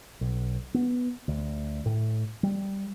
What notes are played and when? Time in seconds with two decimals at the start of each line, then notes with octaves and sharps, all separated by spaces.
0.21 B1
0.74 B3
1.28 D2
1.86 A2
2.43 G3